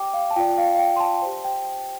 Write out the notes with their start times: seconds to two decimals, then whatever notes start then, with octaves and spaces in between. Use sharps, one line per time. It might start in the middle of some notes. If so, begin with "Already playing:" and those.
Already playing: G4 D5 G5 D6
0.14 F5
0.31 A5
0.36 F4 D5 G5
0.58 F5
0.75 F5
0.79 G5
0.96 C6
1.00 A5
1.22 G4 C5
1.44 G5